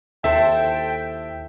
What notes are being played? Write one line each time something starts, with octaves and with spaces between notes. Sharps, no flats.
D#2 E4 A4 C5 E5 G5